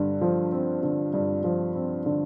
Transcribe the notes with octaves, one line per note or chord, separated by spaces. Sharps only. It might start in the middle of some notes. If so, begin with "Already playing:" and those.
Already playing: G2 D3
F3
C4
D3
G2
F3
C4
D3